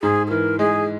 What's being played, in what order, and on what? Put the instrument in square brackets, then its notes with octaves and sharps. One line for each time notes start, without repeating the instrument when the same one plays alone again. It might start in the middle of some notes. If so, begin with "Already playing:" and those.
[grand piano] G#2 [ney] G#4
[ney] G#4
[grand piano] E3 [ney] A#4
[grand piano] G#3 [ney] G#4